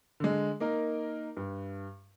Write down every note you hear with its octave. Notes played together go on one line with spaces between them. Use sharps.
D3 G#3
A#3 D#4 A#4
G2